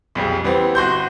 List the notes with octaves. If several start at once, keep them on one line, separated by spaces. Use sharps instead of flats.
B1 F2 G3 G#4
E3 G3 B3 C4
G1 F#4 C6 G6